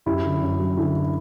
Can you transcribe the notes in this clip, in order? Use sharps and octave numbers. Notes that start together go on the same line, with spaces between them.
F#2 E4 G4
D3
F#2
F#3
D3 E4
D3